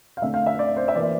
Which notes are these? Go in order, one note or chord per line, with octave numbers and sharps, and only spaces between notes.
F5
D3 A3 C4 E5
F5
E5
D5
C5
E5
E3 A#3 D5